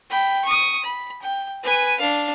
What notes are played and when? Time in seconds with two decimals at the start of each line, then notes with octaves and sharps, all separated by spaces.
0.10 G5 B5
0.44 C#6 D#6
0.83 B5
1.22 G5
1.64 B4 G#5
1.99 D4 F5